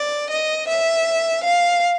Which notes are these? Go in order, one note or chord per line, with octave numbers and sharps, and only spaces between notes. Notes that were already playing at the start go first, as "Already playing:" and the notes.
Already playing: D5
D#5
E5
F5